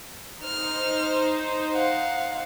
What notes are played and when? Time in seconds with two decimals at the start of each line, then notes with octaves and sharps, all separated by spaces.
0.44 D#4 C5 F6
1.74 F5 F#5